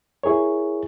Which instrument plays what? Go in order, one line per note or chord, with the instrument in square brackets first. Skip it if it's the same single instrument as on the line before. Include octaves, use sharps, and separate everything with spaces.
[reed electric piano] E4 G#4 A#4 C#5